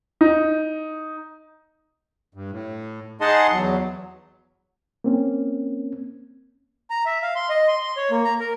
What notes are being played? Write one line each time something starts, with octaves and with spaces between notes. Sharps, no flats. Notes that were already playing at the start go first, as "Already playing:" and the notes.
D#4
G2
A2
D#4 G#4 D#5 F#5 A5 C6
E2 F#3
A#3 C4 C#4
A#5
E5
F5
C6
D#5
C6
C6
C#5
A#3
A#5
A#4